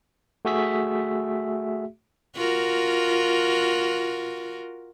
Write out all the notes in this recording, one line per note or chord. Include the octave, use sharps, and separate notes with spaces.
A3 F#4 G#4 E5 B6
F4 F#4 A#4